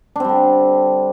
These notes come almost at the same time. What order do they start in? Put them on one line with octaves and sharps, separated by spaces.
D4 C4 G3 D3